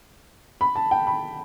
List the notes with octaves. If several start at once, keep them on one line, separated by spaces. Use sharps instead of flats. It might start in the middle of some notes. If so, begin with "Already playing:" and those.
B5
A5
G5
B5